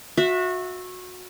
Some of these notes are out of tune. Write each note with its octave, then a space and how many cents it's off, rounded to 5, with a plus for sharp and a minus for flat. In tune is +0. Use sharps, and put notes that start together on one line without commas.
F#4 -25 E5 +0